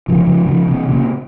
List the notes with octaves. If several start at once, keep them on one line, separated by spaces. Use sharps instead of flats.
C#3 F3
C#3 F3
C#3 F3
C3 E3
A#2 C#3